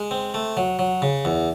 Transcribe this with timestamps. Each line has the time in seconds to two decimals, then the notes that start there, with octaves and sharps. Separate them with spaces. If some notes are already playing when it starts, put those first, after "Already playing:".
Already playing: G#3
0.11 C4
0.34 A3
0.57 F#3
0.79 F#3
1.02 C#3
1.25 E2